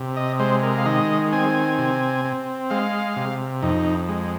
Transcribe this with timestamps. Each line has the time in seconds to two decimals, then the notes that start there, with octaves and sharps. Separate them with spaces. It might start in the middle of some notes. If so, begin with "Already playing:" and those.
Already playing: C3
0.17 D#5
0.40 G#3 C5
0.63 A#4
0.78 F5
0.85 D#3 D#5
1.33 C4 G#5
1.78 C3
2.25 C4
2.70 G#3 F5
3.16 C3
3.62 F2 D#4
4.09 G#3